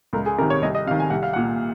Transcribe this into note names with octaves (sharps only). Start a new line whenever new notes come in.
C#2 A#4
G#4
C3 D#3 A#4
C#5
C2 D#5
D#5
C3 D#3 F5
G#5
C2 F#5
F5
A#2 F#5